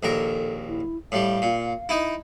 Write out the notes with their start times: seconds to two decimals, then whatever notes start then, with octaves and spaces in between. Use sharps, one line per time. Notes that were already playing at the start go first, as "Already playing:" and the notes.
0.03 A#1 D#2 A4 A#4
0.68 E4
1.12 A2 G3 F5
1.42 A#2
1.89 D#4 E4